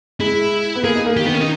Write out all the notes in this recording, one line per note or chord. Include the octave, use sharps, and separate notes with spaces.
G#3 E4
B3
A#3 G#4
D#4
A#3
D#3 G4
B3
C#4
D#4